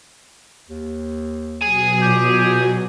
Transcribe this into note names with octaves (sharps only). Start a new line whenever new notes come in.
D#2
B2 F#3 G#4 G#5
A#2 G4